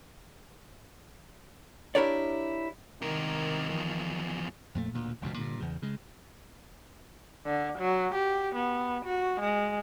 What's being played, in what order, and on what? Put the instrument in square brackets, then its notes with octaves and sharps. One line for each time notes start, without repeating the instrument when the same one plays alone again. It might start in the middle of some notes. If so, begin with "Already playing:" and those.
[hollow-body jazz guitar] D4 E4 G4 A#4 C#5 D5
[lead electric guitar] C3 A#4 [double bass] D#3
[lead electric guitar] E2 F3
[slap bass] F2 A#2 A3
E1 D2 A#2
E1 C#2 F#2 B2
G2 A#2 D3
E2 C#3
C#3 G#3
[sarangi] D3
F#3
G4
B3
F#4
G#3